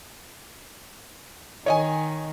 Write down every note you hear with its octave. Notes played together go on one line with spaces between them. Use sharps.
D#3 C#5 D#5 G#5